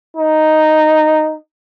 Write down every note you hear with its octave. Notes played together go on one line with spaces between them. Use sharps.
D#4